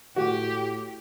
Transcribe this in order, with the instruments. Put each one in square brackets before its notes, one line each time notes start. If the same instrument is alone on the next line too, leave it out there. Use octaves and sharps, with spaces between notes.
[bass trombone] A2 [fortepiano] F#4 [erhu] G4